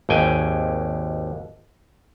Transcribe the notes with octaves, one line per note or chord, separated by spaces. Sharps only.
G#1 D#2 G5 G#5